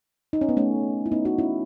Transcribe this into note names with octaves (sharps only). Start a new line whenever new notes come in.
D#4
C#4
B3
A3 C#4
E4
B3 D#4
D#4 F#4
C#4 E4